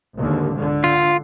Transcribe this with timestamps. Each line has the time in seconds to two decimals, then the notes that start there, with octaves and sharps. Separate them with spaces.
0.16 G#1 D#2 D3
0.54 C#2 D3
0.84 F4